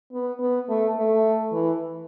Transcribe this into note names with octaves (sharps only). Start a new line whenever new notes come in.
B3
B3
A3
A3
E3